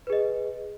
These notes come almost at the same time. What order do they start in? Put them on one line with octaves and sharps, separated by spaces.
B4 G#4 D#5